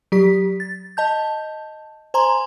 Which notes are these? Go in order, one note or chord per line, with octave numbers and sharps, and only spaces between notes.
F#3 G4 B6
A6
D#5 A5 G6
C5 G#5 A#5 C6